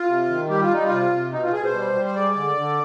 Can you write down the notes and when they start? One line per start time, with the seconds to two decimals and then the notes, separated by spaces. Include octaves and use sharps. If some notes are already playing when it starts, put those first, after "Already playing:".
Already playing: F4
0.08 C3
0.29 D#3
0.49 G3 G4
0.62 F4
0.70 G3 D#4
0.85 F4
0.91 C3
1.12 C3
1.32 B2 D#4
1.43 F4
1.53 B2 G#4
1.64 C5
1.74 G3
1.94 G3
2.05 C5
2.15 G#3 D5
2.36 D3
2.56 D3